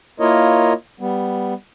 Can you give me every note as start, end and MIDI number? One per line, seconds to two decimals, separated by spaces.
0.20 0.73 58
0.20 0.73 64
0.20 0.73 65
0.20 0.73 70
0.20 0.73 73
0.20 0.73 75
1.00 1.54 55
1.00 1.54 59